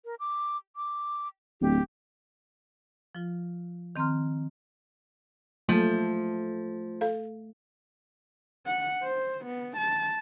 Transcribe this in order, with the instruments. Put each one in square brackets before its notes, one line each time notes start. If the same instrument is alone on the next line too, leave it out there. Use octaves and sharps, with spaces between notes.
[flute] A#4
D6
D6
[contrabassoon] D1 [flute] G4
[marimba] F3 F4
D#3 C4 A#5 C6 F6
[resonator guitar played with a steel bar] F3 [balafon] F#3 A#3 [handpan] A3
[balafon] A4 F5
[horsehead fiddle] F#5
C5
B3
A5